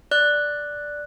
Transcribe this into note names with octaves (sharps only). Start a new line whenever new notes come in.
D5 F#6